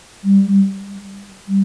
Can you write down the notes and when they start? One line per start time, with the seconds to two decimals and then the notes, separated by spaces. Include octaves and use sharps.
0.24 G3
1.48 G3